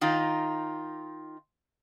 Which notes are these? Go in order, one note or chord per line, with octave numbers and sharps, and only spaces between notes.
D#3 D#4 F4